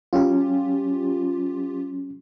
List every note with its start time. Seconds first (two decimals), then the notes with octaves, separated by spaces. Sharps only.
0.13 F#3 C#4 F4 G4